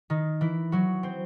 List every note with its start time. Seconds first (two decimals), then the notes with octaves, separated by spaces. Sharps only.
0.10 D#3 D#4
0.41 E3 E4
0.72 F#3 F#4
1.03 C4 C5